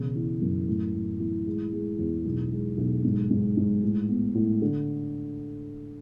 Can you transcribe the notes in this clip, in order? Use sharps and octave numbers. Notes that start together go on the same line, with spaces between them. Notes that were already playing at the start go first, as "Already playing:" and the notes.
Already playing: E1 C#3
E3
F#2
A2
A2
E3
G#3
G#3
E2
B1
G#3
B1
G#2
G#2
G#2
A2
B3
A2
D3